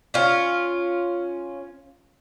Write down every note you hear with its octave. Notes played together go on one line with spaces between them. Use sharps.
C#4 F4